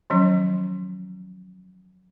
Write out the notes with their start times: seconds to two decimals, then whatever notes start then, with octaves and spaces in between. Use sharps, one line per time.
0.10 D#3 F3 F#3 C#4